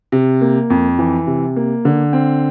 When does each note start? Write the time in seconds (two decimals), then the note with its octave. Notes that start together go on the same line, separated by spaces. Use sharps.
0.12 C3
0.41 A#3
0.70 F2
0.99 E3
1.27 C3
1.56 A#3
1.85 D3
2.13 C4